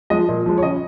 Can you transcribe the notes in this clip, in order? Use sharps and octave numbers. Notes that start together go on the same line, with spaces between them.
F3 G#3 D#5
A#2
F3 G#3
C#5
C#3 D#5